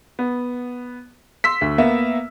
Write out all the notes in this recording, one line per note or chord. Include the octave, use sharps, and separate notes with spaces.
B3
C6 E6 B6
D2
A#3 B3 E5